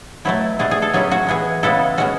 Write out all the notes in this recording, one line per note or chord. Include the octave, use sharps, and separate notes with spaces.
B2 F#3 A3 E4
B2 A3 D4 G#4
G#4
A4
F#3 C#4 E4 G#4
F#4
E3 G#3 B3 G#4
C#3 G#3 B3 E4 A4
B2 G#3 C#4 F#4